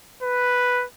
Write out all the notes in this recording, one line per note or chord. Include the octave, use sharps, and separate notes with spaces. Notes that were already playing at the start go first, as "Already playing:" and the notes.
B4